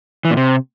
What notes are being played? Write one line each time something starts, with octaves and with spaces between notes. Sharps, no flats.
E3
A#2
C3